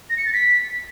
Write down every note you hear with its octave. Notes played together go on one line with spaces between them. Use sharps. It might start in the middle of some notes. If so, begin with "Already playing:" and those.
A#6
C#7
A6
B6